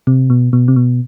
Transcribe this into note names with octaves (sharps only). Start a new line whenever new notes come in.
C3
B2
B2
C3
B2